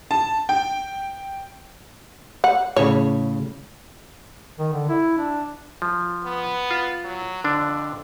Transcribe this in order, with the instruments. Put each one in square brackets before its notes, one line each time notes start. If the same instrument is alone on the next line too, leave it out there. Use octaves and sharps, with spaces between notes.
[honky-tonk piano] A5
G5
[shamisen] F#5
[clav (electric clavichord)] A2 C#3 [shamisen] C#5
[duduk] D#3
D3
E4
D4
[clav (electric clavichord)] F3
[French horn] B3
[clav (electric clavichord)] F4
[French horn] F#3
[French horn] F2 [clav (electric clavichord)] D3 D4